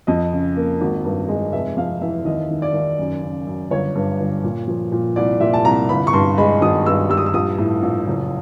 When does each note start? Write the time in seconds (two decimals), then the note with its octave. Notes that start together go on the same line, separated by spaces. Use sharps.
0.07 F2 D#5
0.32 C#3
0.56 A#3
0.81 G#1
1.05 G2
1.29 G#3
1.52 F1 E5
1.77 F2 F5
2.01 E3 E5
2.25 D#2 D#5
2.50 D#3
2.62 D5
2.74 D#2
2.98 F#2
3.22 C#3
3.47 F#2
3.71 G1 C#5
3.95 G2
4.20 G1
4.44 A#2
4.67 F3
4.92 A#2
5.16 C2 D5
5.40 A#2 E5
5.53 A5
5.64 C2 A#5
5.89 G1 B5
6.07 C#6
6.13 G2 C6
6.38 G#3 B5
6.61 G#1 D#6
6.86 G2 E6
7.09 G3 E6
7.17 D#6
7.26 E6
7.34 A#1 D#6
7.58 A2
7.82 A#1
8.07 F#1